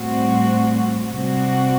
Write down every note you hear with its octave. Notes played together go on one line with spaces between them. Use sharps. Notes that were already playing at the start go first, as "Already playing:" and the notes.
Already playing: A2 G3 C4 F#4
C3 G3 C4 F#4